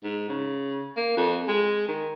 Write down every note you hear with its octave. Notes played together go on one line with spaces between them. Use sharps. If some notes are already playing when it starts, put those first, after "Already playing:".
G#2
C#3
A#3
F2
G#3
D#3